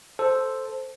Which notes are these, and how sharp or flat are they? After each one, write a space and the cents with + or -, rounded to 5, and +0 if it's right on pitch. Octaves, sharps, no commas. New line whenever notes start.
A4 +0 C5 +0